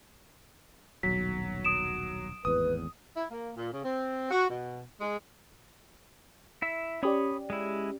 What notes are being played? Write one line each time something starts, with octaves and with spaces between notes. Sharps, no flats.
D#1 B1 F#3 B6
D#6 D7 E7
G#1 E2 A2 B4 D#6
E4
A#3
A#2
C#3
C4
F#4
B2
G#3
E4 E5
C#4 G4 C#5 D5 B5 D#6
G#3 E4